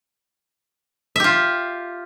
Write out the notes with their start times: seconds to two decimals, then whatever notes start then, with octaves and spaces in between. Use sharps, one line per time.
1.16 E5
1.20 G4
1.24 F4